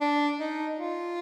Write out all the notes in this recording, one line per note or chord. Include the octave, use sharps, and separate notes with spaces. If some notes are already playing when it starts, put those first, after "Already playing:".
D4
D#4
F4